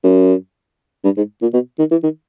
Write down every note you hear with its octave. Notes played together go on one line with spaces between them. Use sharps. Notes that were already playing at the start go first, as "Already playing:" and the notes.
F#2
G2
G#2
A#2
B2
D#3
E3
D#3